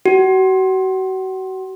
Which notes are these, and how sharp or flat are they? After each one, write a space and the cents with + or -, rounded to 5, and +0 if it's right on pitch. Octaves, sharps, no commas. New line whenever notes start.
F#4 +35